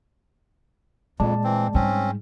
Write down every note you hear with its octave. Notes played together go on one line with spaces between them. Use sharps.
F2 A#2 G#3 D5 A5
E3 C4
G#2 G3 C4 C#4